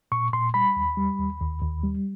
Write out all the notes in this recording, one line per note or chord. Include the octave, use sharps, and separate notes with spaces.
A#2 C#6
A#2 C6
G3 B5
D#2
G3
D#2
D#2
D#2
G3